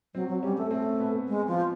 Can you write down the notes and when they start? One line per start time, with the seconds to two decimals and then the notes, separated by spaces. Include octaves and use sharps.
0.14 F#3 C4
0.29 F#3
0.43 G3 C#4
0.57 A3
0.71 A3 C4
1.00 B3
1.28 G#3
1.48 F3